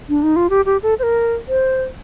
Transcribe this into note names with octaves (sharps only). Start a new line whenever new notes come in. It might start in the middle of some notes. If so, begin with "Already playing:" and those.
D4
D#4
F4
G4
G4
A4
C5
A#4
C5